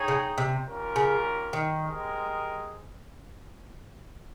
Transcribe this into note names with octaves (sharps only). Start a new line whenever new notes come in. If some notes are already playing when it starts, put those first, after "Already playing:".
Already playing: D#4 G#4 C#5 G5
C#3
C3
G3 C#4 F4 A#4
C#3
D#3
G#3 C4 G4 A#4 D#5